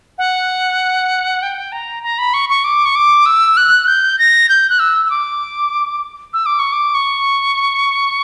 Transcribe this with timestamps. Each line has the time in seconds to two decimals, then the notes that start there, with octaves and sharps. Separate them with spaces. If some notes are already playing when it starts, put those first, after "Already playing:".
0.18 F#5
1.42 G5
1.72 A#5
2.03 A#5
2.18 B5
2.34 C#6
2.49 C#6
2.64 D6
2.85 C#6
2.96 D6
3.26 E6
3.57 F#6
3.87 G6
4.19 A#6
4.49 G6
4.70 F#6
4.79 E6
5.06 E6
5.10 D6
6.33 E6
6.46 D6
6.59 C#6
6.72 D6
6.94 C#6